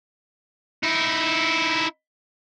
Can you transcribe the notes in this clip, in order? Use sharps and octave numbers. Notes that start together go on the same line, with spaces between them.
D#4 E4